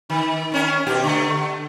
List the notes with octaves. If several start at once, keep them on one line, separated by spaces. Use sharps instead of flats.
D#3
D#3 C#4 A#4
B2 G4
D3 A3